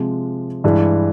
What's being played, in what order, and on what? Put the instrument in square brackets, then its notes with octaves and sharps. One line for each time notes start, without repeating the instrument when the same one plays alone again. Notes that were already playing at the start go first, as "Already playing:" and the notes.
Already playing: [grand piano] C3 F3 G#3
G2 E3 G#3